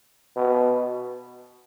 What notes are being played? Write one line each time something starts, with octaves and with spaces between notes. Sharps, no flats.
B2